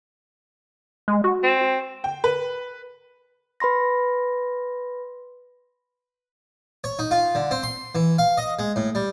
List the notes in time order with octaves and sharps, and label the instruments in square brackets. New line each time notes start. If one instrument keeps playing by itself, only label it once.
[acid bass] G#3
F#4
[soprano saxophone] C4
[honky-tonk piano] G5
B4
[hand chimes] B4 B5 C6 A#6
[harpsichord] C#5
D#4
F4
D3
C4
C6
E3
F5
D#5
G#3
A2
G3